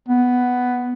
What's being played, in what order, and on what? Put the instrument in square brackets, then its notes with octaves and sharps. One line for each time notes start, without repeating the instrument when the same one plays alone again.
[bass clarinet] B3